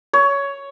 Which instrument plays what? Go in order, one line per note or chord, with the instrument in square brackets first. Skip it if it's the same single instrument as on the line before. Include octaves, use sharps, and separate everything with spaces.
[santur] C#5